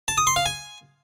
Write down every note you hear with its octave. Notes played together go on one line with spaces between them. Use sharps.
A5
D#6
C6
F5
G#5